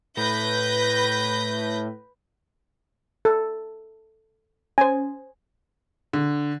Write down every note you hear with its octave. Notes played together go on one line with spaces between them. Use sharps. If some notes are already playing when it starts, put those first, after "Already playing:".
A2 B4 G6 A#6
A4
C#4 C5 G#5
D3